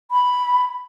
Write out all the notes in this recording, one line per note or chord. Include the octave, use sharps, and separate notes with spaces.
B5